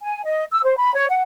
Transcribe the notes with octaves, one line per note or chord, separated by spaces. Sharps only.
G#5
D#5
E6
C5
B5
C#5
F#5